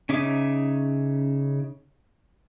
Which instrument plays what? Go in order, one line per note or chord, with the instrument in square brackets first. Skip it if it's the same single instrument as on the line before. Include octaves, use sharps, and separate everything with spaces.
[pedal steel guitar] C#3 C#4 D#4 E5 D6